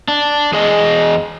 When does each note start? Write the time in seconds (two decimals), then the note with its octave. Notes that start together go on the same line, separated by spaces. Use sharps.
0.08 D4
0.52 E2 G#4 D#5